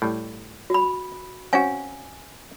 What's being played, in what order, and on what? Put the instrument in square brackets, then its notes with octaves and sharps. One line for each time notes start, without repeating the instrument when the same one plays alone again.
[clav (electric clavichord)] A2 G3
[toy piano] F#4 B5
[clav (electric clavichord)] C4 C#4 F#4 [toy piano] F5 G#5